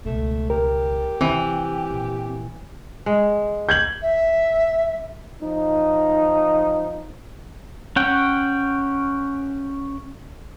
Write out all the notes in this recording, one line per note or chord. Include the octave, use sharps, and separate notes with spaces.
C#2 B2 A3
G4 A#4
C3 E3 C4
A#1
G#3
G6 G#6 F#7
E5
F3 D#4
C#4 F#5 G5